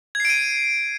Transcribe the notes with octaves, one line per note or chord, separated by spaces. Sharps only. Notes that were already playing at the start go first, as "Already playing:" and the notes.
G#6 C7 D7 D#7